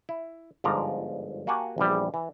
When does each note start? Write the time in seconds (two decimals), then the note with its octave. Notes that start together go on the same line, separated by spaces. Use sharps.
0.09 E4
0.64 G1 G#2 F3 D5 A#5
1.47 A#3 F#4 G4 F#5 G#5 A5
1.78 A#1 E2 G3
2.14 E3